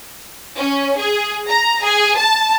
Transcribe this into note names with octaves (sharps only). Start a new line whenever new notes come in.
C#4
G#4
A#5
G#4
A5